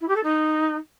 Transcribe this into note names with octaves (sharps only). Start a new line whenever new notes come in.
E4
G4
A4
D#4